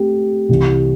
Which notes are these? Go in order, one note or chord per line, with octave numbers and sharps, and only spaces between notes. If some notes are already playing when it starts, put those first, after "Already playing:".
Already playing: A3 C4 G4
C2 C3 E3